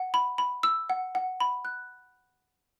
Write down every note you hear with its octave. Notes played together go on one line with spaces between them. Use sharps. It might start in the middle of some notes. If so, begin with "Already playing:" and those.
Already playing: F#5
B5
B5
E6
F#5
F#5
B5
F#6